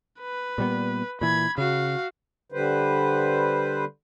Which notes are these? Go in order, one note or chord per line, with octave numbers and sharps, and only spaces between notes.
B4
A#2 G3 B3
A#2 E3 B5 G#6
C#3 F#4 F5
D3 G3 B4 C5